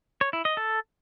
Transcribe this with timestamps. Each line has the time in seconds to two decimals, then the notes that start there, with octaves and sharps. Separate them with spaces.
0.21 C#5
0.33 E4
0.45 D#5
0.57 A4